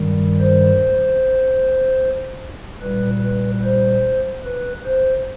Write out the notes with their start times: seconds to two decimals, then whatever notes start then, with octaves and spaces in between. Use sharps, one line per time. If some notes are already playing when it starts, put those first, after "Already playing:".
Already playing: G2 D#3 G3
0.39 C5
2.82 A#2 G3 B4
3.23 B4
3.63 C5
4.45 B4
4.85 C5